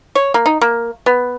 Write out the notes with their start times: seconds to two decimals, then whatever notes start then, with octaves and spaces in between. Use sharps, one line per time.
0.15 C#5
0.34 A#3
0.46 D#4
0.61 A#3
1.06 B3